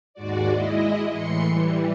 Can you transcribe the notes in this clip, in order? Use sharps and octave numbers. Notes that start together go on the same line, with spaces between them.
D#2 G#2 G#3 F#4 D5
G#3 E4 D#5
A2 E3 C6 C#7
E3 G3